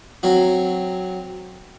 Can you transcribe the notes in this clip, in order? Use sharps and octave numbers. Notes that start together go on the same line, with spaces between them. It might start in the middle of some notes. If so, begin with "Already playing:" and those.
F#3 C4 F#4